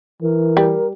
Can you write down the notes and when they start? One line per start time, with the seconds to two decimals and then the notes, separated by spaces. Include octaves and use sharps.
0.22 E3 A#4
0.57 G3